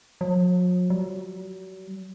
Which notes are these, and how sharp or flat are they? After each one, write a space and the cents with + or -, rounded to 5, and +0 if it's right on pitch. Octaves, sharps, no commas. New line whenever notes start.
F#3 -45
F#3 +40